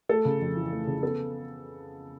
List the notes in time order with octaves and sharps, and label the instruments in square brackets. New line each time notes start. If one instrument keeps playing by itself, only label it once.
[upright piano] A3 A4
C#3
F2
E3
A3
C#3
B3 A4